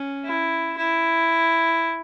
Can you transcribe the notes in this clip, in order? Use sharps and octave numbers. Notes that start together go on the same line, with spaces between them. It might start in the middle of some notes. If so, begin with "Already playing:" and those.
Already playing: C#4
E4
E4